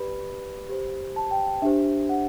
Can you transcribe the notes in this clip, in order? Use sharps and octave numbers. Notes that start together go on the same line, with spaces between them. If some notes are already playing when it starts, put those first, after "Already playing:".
Already playing: G4 B4 D5 B5
G4 C5
A5
G5
D4 G4 C5 E5
F#5